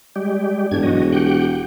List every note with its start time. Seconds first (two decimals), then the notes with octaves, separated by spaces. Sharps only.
0.16 G3 G#3 G4
0.71 E1 G2 D4 G#6
0.83 F#3 F#4 D#5
1.12 G4 F#5 G5